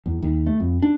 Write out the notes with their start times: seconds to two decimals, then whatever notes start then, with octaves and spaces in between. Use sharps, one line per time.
0.06 E2
0.22 D#2
0.47 A3
0.60 F2
0.82 D4